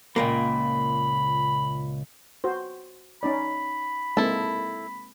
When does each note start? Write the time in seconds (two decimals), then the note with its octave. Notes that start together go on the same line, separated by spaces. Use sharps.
0.16 C#2 A#2 A#3 B5
2.44 F#4 C5
3.23 C#4 D#4 D5 B5
4.17 G#3 A#3 C4 E4 A4